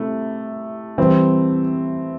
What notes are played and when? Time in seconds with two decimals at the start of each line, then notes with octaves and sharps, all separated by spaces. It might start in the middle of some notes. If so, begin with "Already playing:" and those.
Already playing: C3 A3 E4
0.97 C3 E3 G3 C4